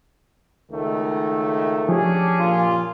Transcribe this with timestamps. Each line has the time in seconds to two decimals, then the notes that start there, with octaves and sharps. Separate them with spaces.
0.71 C#2 D#3 A3
1.89 F3 C#4 D4 G4 G#4
2.39 A#2 F4